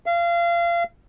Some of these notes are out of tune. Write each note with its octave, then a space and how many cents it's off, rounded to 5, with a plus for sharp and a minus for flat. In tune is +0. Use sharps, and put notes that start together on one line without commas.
F5 -30